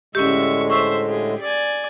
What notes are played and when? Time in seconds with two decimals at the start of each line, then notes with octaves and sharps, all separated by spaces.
0.15 A2 D3 G#3 C#4 G4 E5 C#6
0.70 C5 E5 C#6
1.06 G4 G#4
1.42 D5 G#5